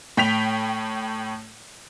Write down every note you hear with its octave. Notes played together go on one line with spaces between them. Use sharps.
A2 G5 B6 F7